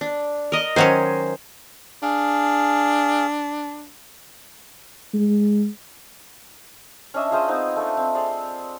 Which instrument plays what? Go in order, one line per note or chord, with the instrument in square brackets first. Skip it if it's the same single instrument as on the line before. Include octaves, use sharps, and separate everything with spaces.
[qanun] D4
A#4 D#5
[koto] D#3 F#3 C#4 [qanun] C5 G#5
[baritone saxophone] D4 [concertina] G#4 F5
[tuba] G#3
[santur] C#4 D4 D#5 E5
F4 G#4 C5 D#5
B3 C4 D#4
A3 D4
C4
G#4 C5 D5 F5